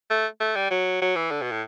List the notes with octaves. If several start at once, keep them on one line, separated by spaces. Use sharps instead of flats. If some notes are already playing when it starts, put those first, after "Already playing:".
A3
A3
G3
F#3
F#3
E3
D3
B2
A2